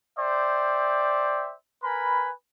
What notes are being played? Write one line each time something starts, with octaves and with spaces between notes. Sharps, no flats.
C5 D5 E5 G5
A#4 B4 G#5 B5